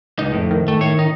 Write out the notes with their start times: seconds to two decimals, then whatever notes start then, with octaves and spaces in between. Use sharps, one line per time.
0.19 C#2 D#4
0.32 F2 A2
0.51 D#3
0.68 A3
0.81 A2 C#5
0.99 D#4